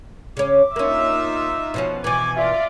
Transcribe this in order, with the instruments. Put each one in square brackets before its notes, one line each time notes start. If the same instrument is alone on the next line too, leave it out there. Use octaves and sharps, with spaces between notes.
[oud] C#3 C#4 [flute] D6
[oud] A#3 C#4 [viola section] D#4 F4 E5
[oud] B2 F3 C#4
[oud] B2 E3 [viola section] G#5 [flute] D6
[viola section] F4 D5 [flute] E5